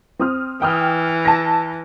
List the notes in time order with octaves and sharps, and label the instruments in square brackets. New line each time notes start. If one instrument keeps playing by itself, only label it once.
[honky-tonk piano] C4 D#6 F6
[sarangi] E3 [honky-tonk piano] G5 D#6 F6
[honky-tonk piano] A5 A#6